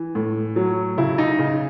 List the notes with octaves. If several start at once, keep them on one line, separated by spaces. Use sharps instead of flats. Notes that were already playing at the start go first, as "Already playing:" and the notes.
Already playing: E3
A2
F#3
C#3 E4
D#4
C#3